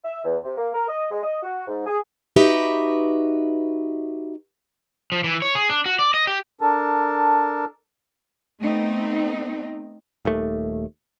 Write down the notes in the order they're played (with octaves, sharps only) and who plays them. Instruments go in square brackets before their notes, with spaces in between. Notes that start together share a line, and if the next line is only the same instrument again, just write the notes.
[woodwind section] E5
E2
C3
A#3
A#4
D#5
G#3
D#5
F#4
G#2
G#4
[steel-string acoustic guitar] D#4 F#4 G4 B4 D#5 E5
[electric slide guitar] F3
E3
C#5
G#4
D4
F#4
D5
D#5
G4
[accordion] D4 A4 A#4 A5
[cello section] A3 B3 C4 D#4
[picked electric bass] D#1 D#2 A3